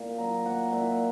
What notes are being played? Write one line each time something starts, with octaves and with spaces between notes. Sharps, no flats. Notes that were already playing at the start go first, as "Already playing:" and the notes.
Already playing: A#2 A#3
F#3 A#5
A#3 F#5
A#2 E5